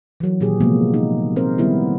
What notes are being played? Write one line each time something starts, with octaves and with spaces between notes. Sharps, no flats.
E3 F#3
A#2 D#3 G4 G#4
C3 F3 G#3 A#3 B3
D#4
C4 A#4 C5
D#3 G3 B3 E4